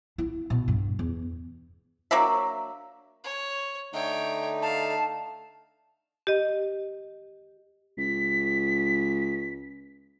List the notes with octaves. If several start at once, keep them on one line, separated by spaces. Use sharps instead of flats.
E4
B2
G2
E2
F#3 A#3 D4 E5
C#5
D3 A3 D#4 C#5 G5
F5 A5
G4 D#5
C#2 B6